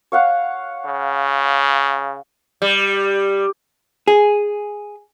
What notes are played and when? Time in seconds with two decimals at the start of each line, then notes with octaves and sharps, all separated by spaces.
0.12 C#5 F5 F#5
0.86 C#3
2.62 G3
4.08 G#4